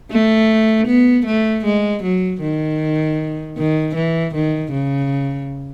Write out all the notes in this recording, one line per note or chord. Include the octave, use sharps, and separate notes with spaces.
A3
B3
A3
G#3
F#3
D#3
D#3
E3
D#3
C#3